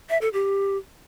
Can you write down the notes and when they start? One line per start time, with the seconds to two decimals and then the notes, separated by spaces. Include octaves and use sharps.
0.09 E5
0.21 A4
0.33 G4